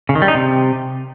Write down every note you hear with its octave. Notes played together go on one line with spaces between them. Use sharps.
C#3
D#3
G3
D#4
C3